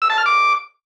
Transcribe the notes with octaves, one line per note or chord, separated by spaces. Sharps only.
E6
A5
F6
D6